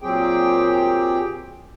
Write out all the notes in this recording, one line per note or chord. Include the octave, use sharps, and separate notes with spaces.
A#2 F#3 C4 G4 G#4 G5